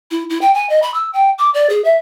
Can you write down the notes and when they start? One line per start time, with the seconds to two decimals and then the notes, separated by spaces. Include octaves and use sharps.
0.11 E4
0.30 E4
0.41 G5
0.54 G#5
0.70 D#5
0.82 B5
0.94 E6
1.13 G5
1.38 D6
1.54 D5
1.70 G#4
1.84 E5